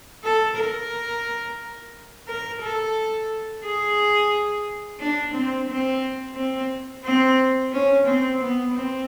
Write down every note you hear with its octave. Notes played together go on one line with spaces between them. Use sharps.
A4
A#4
A#4
A4
G#4
D4
C4
C4
C4
C4
C#4
C4
B3
C4